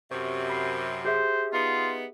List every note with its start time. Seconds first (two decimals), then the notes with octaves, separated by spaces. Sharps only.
0.11 F#2 C3 C5 C#6
0.50 B5 C7
1.05 G4 G#4 C5 E5
1.53 B3 D#4 F4